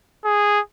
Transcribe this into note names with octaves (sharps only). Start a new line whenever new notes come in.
G#4